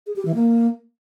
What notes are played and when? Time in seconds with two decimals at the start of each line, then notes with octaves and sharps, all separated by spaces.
0.07 G#4
0.16 G4
0.25 E3
0.35 A#3